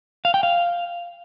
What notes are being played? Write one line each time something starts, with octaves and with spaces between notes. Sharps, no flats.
F5
G5
F5